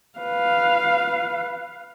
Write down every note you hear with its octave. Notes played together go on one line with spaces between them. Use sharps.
B4 F5